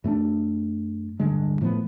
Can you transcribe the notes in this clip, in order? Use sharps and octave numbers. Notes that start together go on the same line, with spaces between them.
F#2 A3 A#3 D4
D1 G2 D3 G#3
A2 F3 A3 B3